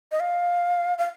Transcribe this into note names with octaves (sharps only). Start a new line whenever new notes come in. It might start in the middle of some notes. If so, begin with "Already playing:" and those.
D#5
F5
F5